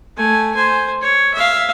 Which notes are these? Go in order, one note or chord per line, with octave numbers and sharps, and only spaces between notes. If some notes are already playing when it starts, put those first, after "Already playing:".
A3 G#5
C5 G#5
C#5
E5 F5